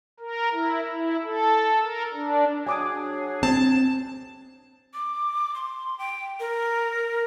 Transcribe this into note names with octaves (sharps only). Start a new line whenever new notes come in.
A#4
E4
E4
A4
A#4
D4
F#3 D4 G#4 G#5 D6 D#6
C4 A5
D6
C6
G5
A#4